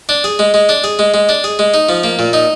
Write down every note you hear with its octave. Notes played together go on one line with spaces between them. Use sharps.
D4
G#4
G#3
G#3
D4
G#4
G#3
G#3
D4
G#4
G#3
D#4
F3
A#3
A#2
D#4